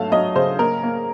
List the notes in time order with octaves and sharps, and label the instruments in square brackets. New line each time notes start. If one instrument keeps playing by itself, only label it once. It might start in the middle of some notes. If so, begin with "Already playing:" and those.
Already playing: [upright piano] F#3 A3 F5 A5
F#3 D#5
C#3 C5
A#3 A#4
A#3